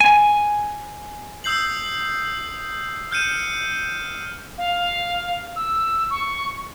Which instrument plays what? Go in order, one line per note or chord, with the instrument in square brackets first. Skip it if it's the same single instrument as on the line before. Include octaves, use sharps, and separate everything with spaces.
[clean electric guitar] G#5
[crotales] D#6 E6 G6 C7 F#7
F6 G6 C#7 D#7 E7
[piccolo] F5
E6
C#6